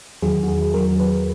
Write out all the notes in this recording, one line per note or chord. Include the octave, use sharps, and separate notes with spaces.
E2 D#3 F#3 G#4
F#4
G#4
E2 D#3 F#3 A#4
B4